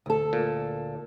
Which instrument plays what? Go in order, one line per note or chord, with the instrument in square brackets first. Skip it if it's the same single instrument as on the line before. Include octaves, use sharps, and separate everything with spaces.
[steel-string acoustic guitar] D2 A4
[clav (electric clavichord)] A#2